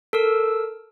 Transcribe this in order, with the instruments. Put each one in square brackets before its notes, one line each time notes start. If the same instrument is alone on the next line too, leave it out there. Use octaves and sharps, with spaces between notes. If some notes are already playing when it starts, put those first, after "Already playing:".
[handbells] A4 A#4 E6